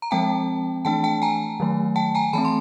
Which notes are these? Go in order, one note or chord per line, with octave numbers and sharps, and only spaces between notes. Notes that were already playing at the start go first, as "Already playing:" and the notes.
A#5
F3 G#3 C4 G5 A5
E3 A3 D4 G5 A5
G5 A5
G#5 A#5
D#3 F#3 A3
G5 A5
G#5 A#5
E3 A3 C4 A5 B5
C6